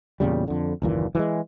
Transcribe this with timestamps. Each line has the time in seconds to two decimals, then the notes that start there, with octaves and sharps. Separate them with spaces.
0.20 E2 A#2 C#3 G3
0.48 F2 D3
0.82 F#1 D#2 A#2 E3
1.15 E3 F#3 G#3